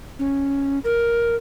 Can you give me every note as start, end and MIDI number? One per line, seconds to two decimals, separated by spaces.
0.19 0.79 61
0.84 1.36 70